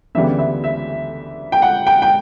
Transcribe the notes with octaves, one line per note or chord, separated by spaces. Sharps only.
D2 C#3 E3 G3 B3 E5
E5
E5
G5
F#5
G5
G5